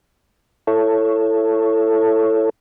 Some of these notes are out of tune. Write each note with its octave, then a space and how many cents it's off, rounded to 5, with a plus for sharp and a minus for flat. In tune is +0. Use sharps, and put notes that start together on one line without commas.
E4 +20 A4 +10 C#5 +0